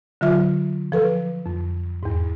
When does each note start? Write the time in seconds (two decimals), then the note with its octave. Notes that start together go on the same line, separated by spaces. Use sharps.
0.21 D3 F#3 F4 E5 F6
0.92 F3 A4 B4
1.46 F2
2.03 E2 G#2